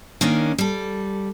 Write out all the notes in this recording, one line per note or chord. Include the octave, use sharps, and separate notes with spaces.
D#3 A#3 C#4 D4
G3 A4